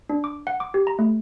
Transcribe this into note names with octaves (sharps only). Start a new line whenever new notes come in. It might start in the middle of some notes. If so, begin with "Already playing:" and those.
D4
D6
F#5
D6
G4
A#5
A3